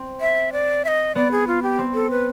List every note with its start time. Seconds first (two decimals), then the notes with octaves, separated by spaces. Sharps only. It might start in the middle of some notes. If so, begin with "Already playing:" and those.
Already playing: C4
0.21 E5
0.52 D5
0.85 E5
0.88 D#5
1.15 B3 D5
1.32 G#4
1.47 F4
1.63 G4
1.78 C4
1.94 A4
2.11 B4